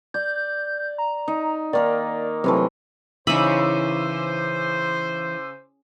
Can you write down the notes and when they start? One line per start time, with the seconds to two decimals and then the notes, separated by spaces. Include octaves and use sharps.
0.14 D5 G6
0.98 A#5
1.28 D#4
1.73 D#3 A#3 A#4 D5
2.44 C3 E3 F#3 A3
3.27 C#3 E3 D#4 C5 B5 D6 E6 D#7